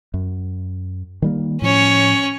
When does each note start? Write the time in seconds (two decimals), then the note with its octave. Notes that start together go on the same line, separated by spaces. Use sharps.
0.14 F#2
1.22 D#3 G3 A#3
1.62 A2 F3 C#4 C#5